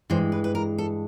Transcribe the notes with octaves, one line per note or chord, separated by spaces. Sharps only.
G2 E3 G#3 C5
B4
B4
A#4
A4